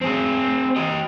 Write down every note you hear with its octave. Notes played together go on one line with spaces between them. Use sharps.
C4 G#4
G4 D#5